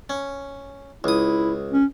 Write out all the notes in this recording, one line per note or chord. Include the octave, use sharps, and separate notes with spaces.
C#4
C#2 E4 D#6
C#4